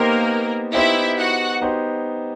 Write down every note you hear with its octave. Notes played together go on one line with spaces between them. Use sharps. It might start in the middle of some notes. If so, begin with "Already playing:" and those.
Already playing: A#3 B3 D#4 G4 A#4 C5
B3 D#4 E4 G4 C5 E5
F#4 F#5
B3 D#4 G4 C5